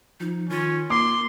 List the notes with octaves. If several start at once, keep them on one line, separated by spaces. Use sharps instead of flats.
F3 D#4
D#3 C#4 F4
A#3 C6 D6